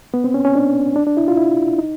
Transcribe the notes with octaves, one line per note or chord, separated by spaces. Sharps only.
B3
C4
C#4
C#4
D4
D4
D4
E4
F4
E4
D#4